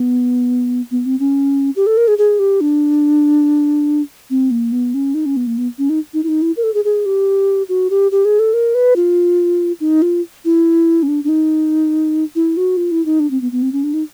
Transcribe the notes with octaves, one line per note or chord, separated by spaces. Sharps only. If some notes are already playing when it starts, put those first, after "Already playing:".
Already playing: B3
B3
C4
C#4
G4
A4
A#4
G#4
G#4
G4
D4
C4
A#3
B3
C#4
D#4
C#4
B3
A#3
B3
C#4
D#4
D#4
E4
D#4
E4
A#4
A4
G#4
G#4
G4
F#4
G4
G4
G#4
A4
A#4
B4
F4
D#4
F4
E4
C#4
D4
D4
D#4
E4
F#4
F4
E4
D#4
D4
C4
B3
B3
C4
C#4
D4
D#4